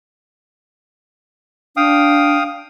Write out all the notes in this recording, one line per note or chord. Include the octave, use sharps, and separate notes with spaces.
D4 F5 G5 D#6